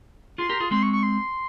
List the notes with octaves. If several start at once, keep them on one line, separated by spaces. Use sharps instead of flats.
F4 G#4 C6
G4 A#4
F4 G#4
G#3 C4 C6
C#6
C#6
C6